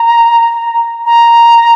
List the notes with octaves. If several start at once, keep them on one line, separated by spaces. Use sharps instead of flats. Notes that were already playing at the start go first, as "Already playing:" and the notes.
Already playing: A#5
A#5